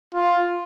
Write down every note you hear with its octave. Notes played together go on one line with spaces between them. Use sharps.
F4